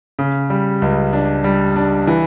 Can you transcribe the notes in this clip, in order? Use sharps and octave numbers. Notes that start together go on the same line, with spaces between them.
C#3
G3
C#2
D4
G3
D4
E3